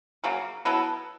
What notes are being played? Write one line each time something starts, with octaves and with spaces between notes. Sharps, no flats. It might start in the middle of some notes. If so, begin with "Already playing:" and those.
C#3 F#3 A#3
F#3 B3 E4 A4